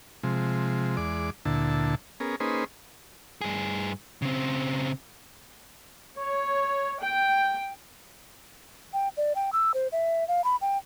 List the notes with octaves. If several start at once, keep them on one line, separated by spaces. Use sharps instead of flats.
C3 F3 G#3
E2 G#3 D5 D6
D2 A#2 D3 E4 A5
B3 C#4 G#4 A#4
A#3 C#4 D#4 G#4 B4 C5
G2 G#4
C#3 C4
C#5
G5
G5
D5
G5
E6
C5
E5
F5
B5
G5